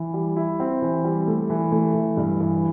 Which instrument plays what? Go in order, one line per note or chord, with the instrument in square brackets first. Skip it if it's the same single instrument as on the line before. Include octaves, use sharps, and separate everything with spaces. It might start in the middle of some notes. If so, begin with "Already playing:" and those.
Already playing: [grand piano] E3
G3
E4
C4
E3
G3
A3
E3
A3
E3
G2
E3